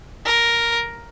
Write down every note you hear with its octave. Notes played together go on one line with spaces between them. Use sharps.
A#4